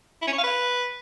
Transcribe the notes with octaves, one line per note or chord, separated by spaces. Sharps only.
E4
C#4
C#5
F5
B4